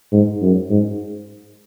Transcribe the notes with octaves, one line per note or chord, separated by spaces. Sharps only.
G#2
F#2
G#2